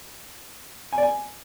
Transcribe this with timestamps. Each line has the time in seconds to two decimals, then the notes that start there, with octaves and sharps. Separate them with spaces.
0.93 G#5
0.98 D5
1.03 G#5